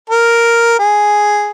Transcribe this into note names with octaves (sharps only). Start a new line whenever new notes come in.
A#4
G#4